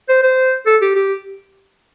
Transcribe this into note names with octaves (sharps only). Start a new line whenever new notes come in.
C5
C5
A4
G4
G4